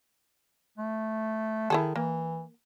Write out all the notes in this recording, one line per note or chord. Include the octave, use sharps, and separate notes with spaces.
A3
D#3 E4 G#4 A4
E3 A#3